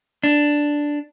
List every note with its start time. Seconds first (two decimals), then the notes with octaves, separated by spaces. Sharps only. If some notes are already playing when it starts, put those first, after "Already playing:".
0.24 D4